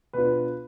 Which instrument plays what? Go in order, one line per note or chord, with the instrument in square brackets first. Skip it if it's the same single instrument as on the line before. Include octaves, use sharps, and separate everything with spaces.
[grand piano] B2 B3 D4 F4 B4